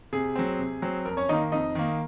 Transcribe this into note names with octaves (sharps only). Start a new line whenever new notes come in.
C3 G#4
F#3 C4
C3
F#3 C4
F2 A#4
C#4 C#5
D#3 A#3 D#4 D#5
F2 D#4 D#5
D#3 A#3